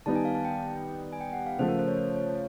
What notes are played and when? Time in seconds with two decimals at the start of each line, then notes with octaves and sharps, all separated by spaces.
0.06 D#3 G3 B3 D#4 A5
0.16 G#5
0.25 F5
0.35 A5
0.45 G5
1.13 G#5
1.21 G5
1.33 F#5
1.46 F5
1.58 C#3 F3 A3 C5
1.68 A#4
1.79 C5
1.88 C#5
1.97 C5
2.16 C#5